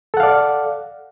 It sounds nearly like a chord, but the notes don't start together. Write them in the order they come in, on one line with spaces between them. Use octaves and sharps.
A4 F#5 F5 D5